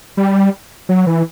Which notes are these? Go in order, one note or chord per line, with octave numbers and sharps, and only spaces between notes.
G3
F#3
E3